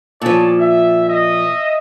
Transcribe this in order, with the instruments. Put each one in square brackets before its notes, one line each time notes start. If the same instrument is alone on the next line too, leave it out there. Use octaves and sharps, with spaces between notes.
[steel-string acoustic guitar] A#2 F3 [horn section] C#5 D5 A5
[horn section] E5
D#5 E5